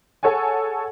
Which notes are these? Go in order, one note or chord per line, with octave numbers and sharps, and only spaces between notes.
G#4 A4 C#5 F#5 G#5